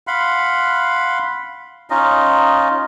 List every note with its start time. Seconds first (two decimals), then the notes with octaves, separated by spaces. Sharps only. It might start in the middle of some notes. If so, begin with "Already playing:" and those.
0.07 F5 F#5 B5 C6
1.90 C#4 D#4 F4 D#5